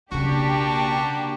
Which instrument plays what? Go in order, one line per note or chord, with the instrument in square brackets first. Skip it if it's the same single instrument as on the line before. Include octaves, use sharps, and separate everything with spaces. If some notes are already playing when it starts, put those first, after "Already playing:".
[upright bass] B1 C#3 [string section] A#3 D4 G4 [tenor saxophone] F#4